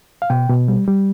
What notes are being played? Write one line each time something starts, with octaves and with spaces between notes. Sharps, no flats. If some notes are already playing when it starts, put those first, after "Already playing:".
F5
B2 G5
B2
G3
G3